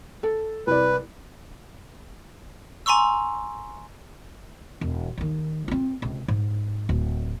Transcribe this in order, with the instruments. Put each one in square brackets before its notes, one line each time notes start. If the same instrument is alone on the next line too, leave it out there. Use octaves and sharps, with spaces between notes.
[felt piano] A4
[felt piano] C2 D5 [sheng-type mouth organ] B4
[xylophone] G#5 A#5 C6 C#6 E6
[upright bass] E1
D#2 D#3
C4 F4
C#2 C3
G#2
D1